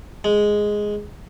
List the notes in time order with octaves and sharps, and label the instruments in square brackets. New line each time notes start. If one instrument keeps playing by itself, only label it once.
[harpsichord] G#3